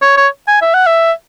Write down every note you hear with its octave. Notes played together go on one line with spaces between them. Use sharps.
C#5
C#5
G#5
E5
F#5
E5